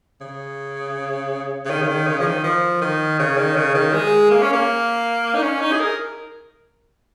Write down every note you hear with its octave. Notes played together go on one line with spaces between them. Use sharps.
C#3
C#3
D#3
C#3
D#3
C#3
F3
D#3
F3
D#3
C#3
D#3
C#3
D#3
G#3
A#3
C#4
A#3
D#4
C#4
D#4
G#4
A#4